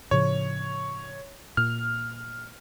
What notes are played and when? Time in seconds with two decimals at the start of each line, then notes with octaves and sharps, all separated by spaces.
0.11 A2 C#3 F3 C#5
1.57 A#2 F6